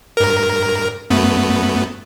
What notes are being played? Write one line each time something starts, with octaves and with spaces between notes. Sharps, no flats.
G2 A#4
F#2 A3 B3